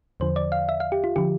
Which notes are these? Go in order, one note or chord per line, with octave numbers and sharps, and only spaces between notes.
E2 D3 F3 C5
D5
F5
E5
F5
G4
F4
D3 F3 G4